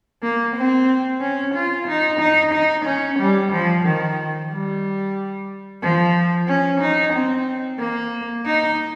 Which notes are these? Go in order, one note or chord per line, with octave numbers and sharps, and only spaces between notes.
A#3
C4
C#4
F4
D#4
D#4
D#4
C#4
G3
F3
D#3
G3
F3
C#4
D#4
C4
A#3
D#4